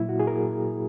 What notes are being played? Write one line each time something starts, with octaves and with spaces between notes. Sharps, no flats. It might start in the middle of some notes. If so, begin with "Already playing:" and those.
Already playing: A#2 F#3 A#3 E4
F#4
G#4
A#4